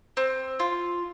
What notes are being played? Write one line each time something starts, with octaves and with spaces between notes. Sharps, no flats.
C4
F4